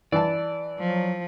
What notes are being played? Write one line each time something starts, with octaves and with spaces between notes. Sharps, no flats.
E3 D5 A5
F3 F#3